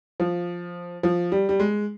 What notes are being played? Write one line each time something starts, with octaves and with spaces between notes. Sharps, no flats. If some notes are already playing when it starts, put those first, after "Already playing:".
F3
F3
G3
G3
G#3